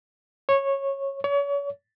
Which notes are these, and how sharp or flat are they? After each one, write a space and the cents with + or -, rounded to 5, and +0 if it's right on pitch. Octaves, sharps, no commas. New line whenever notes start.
C#5 -15
C#5 +35